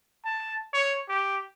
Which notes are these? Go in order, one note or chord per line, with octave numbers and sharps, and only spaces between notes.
A5
C#5
G4